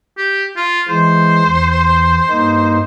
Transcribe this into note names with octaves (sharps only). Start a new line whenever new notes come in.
G4
F4
E3 G#3 C5
E2 C6
G2 A#3 D#4